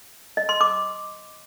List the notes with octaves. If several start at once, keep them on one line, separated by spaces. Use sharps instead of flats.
D#5
C6
D6